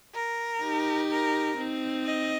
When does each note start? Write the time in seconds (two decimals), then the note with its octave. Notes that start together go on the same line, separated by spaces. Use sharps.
0.15 A#4
0.62 D#4 G4
1.10 A#4
1.58 C4 D#4
2.05 D#5